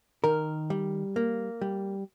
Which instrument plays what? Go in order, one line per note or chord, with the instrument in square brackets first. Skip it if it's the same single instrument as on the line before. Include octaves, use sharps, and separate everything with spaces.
[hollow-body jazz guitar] D#3 A#4
G3
A#3
G3